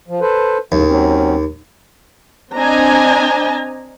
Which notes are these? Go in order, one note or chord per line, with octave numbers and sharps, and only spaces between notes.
F3
A4 B4 C5
D#2 A2 C#3
F#3 C4 C#4
C4 D4 D#5 G#5 A#5